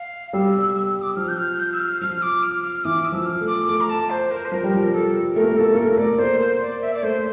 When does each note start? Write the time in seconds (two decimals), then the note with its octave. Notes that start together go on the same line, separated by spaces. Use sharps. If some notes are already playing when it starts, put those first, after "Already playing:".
Already playing: F5
0.33 G3 E6
0.76 E6
1.02 D6
1.09 E6
1.17 F3 F6
1.28 G6
1.38 F6
1.60 G6
1.73 E6
1.80 F6
2.01 F3 F6
2.22 D6
2.43 F6
2.63 F6
2.85 E3 D6
3.05 E6
3.12 F3
3.26 F6
3.40 A3
3.47 D6
3.68 A3 D6
3.81 A#5
3.90 A5
4.10 C5
4.31 A#4
4.45 C5
4.52 F3 A#4
4.64 G3
4.74 F3
4.93 A4
5.36 A3 A#4
5.44 A#3
5.51 A3
5.57 A#3 A4
5.66 A3
5.74 A#3
5.77 A3 A#4
5.90 A#3
5.98 A3 D5
6.19 A#3 C5
6.40 C5
6.61 D5
6.82 E5
6.94 D5
7.03 A3 C5